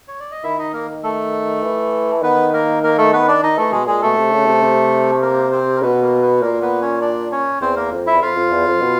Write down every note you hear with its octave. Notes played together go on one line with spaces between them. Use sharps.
C#5
D5
D#5
D#3 E4 E5
D#4 D#5
A#3 A#4
A3 A4
E3
D#3 B3 B4
A#3 A#4
A#3 A#4
A3 A4
B3 B4
D4 D5
D#3 D#4 D#5
E3 A3 A4
B2 G#3 G#4
A#2 G#3 G#4
B2 A3 A4
C3
C#3
C3
C3
A#3 A#4
C4 C5
A#4
B2 B3 B4
A#3 A#4
B3 B4
A#2 A#3 A#4
B3 B4
C#4 C#5
D4 D5
C#4 C#5
E2 C4 C5
A#3 A#4
F2
E4 E5
E2
F2 F4 F5
F2
E2
F2
B2